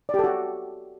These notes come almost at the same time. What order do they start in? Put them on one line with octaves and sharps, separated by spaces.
D5 G4 A4 F#4